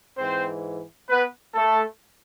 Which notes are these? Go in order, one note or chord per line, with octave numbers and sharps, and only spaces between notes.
G#2 E3 C4 C5
B3 B4
A3 A4